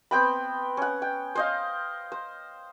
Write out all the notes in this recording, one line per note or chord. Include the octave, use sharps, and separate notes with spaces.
B3 C4 G5 B5
C#4 F#5
G5
C5 D#5 F5
C5